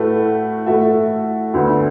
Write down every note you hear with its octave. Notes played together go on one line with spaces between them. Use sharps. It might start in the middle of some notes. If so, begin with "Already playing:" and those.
Already playing: A2 A3 F#4 B4
A2 A3 F#4 A4 E5
D2 D3 B3 F#4